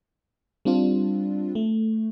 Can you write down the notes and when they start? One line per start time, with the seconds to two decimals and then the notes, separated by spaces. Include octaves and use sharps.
0.65 G3 C4 D4 F4
1.55 A3